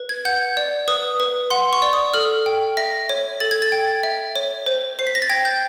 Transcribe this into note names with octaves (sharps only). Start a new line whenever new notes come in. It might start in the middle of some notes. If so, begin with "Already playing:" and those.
Already playing: B4
G#6
F#5 G6
D5
B4 D#6
B4
F#5 C6
C#6
D5
D#6
A4 F6
G5
E5 A#6
C#5
A4 A6
G#6
A6
G5
E5
C#5
C5
C5 C7
B6
A#6
A6
G5 G#6
G6